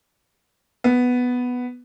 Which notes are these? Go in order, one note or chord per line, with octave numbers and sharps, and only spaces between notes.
B3